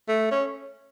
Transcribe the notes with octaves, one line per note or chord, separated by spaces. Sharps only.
A3
C#4